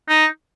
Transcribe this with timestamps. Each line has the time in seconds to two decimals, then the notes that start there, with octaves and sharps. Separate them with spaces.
0.08 D#4